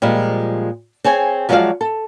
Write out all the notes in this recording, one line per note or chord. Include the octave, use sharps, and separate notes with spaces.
A#2 F3 G3 G#3
C4 G#4 C#5 G#5
F3 F#3 G#3 F#4 D5 F5
A4